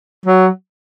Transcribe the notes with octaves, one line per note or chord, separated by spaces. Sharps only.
F#3